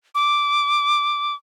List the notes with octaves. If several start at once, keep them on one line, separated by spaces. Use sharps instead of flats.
D6